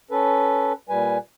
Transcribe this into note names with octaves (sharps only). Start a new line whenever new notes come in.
C#4 A4 B4
A#2 G3 B4 G#5